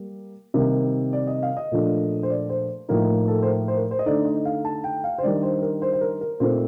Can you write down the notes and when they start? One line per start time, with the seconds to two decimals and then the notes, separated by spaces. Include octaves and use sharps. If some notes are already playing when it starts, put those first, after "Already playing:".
Already playing: G3 A#3
0.54 C3 D#3 G3 A#3
1.13 D5
1.27 D#5
1.43 F5
1.57 D#5
1.72 A#2 F3 A3 D4
2.23 C5
2.30 D5
2.49 C5
2.89 A2 F3 A#3 D#4 A#4
3.28 A4
3.42 C5
3.47 A#4
3.68 C5
3.77 A#4
3.91 C5
3.99 D#5
4.06 D3 A3 D#4 D5
4.25 D#5
4.45 F5
4.65 A5
4.84 G5
5.04 F5
5.18 C5
5.23 D#3 G3 D4 D5
5.43 C5
5.62 A#4
5.82 C5
5.93 C5
6.01 A#4
6.21 A#4
6.40 A#2 A3 C4 D#4 C5